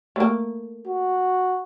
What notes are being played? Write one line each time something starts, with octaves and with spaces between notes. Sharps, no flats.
A3 A#3
F#4